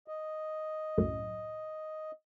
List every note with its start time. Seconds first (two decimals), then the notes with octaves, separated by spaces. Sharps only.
0.08 D#5
0.98 C2 F#2 A2